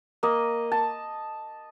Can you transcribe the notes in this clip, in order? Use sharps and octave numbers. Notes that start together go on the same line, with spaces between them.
A#3 D#5
A5